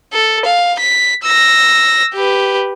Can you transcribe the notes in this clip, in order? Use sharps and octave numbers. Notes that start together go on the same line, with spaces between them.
A4
F5
B6
E6 A#6
G4 B4